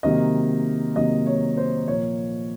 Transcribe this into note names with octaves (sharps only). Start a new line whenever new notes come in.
C3 D#3 F#3 A#3 D#5
C3 D#3 F#3 A#3 D#5
C#5
C5
A#2 F3 A#3 C#5